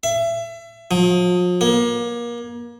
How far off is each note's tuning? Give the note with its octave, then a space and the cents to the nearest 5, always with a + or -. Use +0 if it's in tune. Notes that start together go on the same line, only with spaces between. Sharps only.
E5 +30
F3 +40
A#3 +30